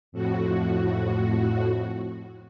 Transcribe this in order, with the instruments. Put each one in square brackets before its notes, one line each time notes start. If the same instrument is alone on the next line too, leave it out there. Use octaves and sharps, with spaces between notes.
[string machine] F2 A2 F#4